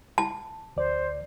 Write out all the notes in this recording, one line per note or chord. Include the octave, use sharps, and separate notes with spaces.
A5
D2 C5 D5